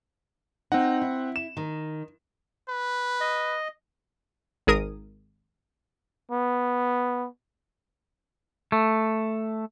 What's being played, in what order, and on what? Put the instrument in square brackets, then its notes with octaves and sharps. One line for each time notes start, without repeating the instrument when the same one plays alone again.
[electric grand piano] C4 F#5 [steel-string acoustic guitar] D#4
[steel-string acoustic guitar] E4
[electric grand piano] E7
[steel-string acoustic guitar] D#3
[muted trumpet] B4
[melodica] D#5
[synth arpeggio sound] G#1 G#4 A#4 D#6 D#7
[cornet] B3
[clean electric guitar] A3